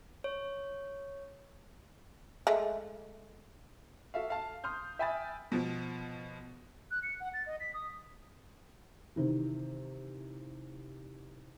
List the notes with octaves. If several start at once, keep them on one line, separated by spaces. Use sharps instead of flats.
C#5
G#3 A3
F#4 A4 E5 F5
A4 F5 A5
C6 D#6 F6 G6
E5 G5 G#5 B5 D#6 A6
B2 F3
F#6
C#7
F#5
A6
D#5
B6
D#6
C3 D#3 E3